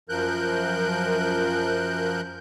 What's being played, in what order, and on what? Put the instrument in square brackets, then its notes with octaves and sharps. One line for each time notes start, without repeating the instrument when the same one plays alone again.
[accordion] F#2 F3 A#4 F#6 G6